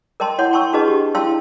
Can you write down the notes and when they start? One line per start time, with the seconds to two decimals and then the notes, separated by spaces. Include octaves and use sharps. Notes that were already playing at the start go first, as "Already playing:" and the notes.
0.20 A#4 D#5 G5 A5 C6
0.39 E4 C#5 F#5 C6
0.53 G5 A5 C6 C#6 E6
0.73 D4 F#4 G#4 B4 D#5 A5
0.88 G4
1.15 E4 F5 G5 A5 C6 E6